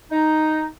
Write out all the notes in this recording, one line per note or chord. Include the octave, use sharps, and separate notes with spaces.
D#4